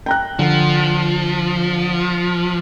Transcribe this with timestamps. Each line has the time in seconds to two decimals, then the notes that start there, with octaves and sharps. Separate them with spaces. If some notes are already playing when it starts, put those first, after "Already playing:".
0.06 G5 A#5 F#6
0.39 D3 F3